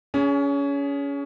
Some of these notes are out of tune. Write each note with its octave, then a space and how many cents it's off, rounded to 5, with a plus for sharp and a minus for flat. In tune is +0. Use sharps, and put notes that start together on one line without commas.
C#4 +25 G#4 +0